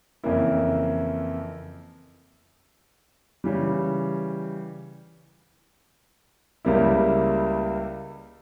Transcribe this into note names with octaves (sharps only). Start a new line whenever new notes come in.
F2 C#3 E3 A#3 E4
C#3 E3 G3
C#2 C#3 G3 A#3 E4